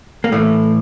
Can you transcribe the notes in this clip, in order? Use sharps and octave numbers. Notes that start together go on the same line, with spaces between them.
A#3
A2 E3 A3